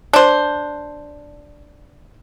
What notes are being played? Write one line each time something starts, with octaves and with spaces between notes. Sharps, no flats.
D4 C5